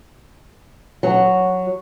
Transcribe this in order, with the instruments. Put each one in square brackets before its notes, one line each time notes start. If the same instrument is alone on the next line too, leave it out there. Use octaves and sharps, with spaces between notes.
[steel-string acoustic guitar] F#3